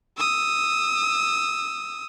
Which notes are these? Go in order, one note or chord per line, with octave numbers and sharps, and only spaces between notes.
D#6 E6